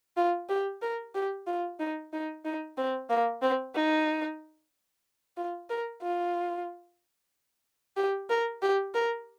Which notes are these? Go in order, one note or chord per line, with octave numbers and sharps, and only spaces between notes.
F4
G4
A#4
G4
F4
D#4
D#4
D#4
C4
A#3
C4
D#4
F4
A#4
F4
G4
A#4
G4
A#4